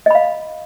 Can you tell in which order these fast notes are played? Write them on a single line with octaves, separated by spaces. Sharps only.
D#5 B5 F5